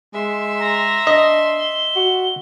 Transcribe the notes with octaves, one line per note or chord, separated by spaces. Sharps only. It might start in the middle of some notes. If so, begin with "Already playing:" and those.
G#3 E5 C6
A#5
D4 D#5
G7
F#4